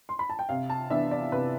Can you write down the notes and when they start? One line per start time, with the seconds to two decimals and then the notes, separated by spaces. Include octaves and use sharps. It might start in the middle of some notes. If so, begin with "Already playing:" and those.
0.09 C6
0.19 B5
0.30 A5
0.39 G5
0.49 C3 F5
0.70 A5
0.90 E3 B3 D4 E5
1.11 D5
1.32 C3 B4